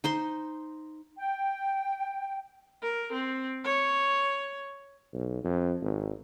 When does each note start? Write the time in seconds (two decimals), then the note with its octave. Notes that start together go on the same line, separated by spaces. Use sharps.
0.04 D#4 C5 C6
1.16 G5
2.82 A#4
3.13 C4
3.64 C#5
5.13 B1
5.44 F2
5.82 G#1